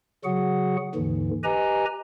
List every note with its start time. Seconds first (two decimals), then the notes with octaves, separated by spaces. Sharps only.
0.25 C#3 F#3 F#4 G#4 F#5
0.95 D#2 G#2 D3 E3
1.44 G4 B4 D#5 G#5 A#5